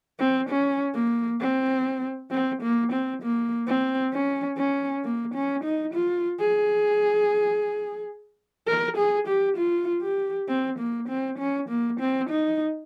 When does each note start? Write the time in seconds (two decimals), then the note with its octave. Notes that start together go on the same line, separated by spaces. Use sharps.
0.19 C4
0.49 C#4
0.94 A#3
1.40 C4
2.31 C4
2.62 A#3
2.92 C4
3.22 A#3
3.67 C4
4.13 C#4
4.58 C#4
5.04 A#3
5.34 C#4
5.64 D#4
5.94 F4
6.40 G#4
8.67 A#4
8.97 G#4
9.28 G4
9.57 F4
10.02 G4
10.48 C4
10.79 A#3
11.09 C4
11.38 C#4
11.69 A#3
12.00 C4
12.29 D#4